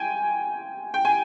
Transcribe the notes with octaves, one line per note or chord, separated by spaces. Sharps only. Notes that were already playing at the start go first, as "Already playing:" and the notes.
Already playing: G5 G#5
G5
G#5